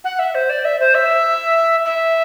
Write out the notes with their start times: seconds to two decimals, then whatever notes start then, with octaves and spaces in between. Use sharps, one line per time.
0.04 F#5
0.19 E5
0.35 C5
0.50 D5
0.65 E5
0.80 C5
0.95 E5
1.85 E5